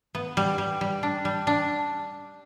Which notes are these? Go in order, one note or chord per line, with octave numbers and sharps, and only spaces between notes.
B3
G3
G3
G3
D4
G3
D4